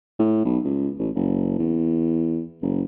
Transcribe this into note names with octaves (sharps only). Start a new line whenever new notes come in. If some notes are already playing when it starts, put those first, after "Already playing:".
A2
B1
C#2
A1
F#1
E2
F#1